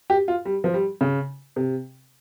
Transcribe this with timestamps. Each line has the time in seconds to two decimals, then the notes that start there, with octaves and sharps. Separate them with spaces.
0.10 G4
0.28 F4
0.45 G3
0.64 F3
0.74 G3
1.01 C#3
1.56 C3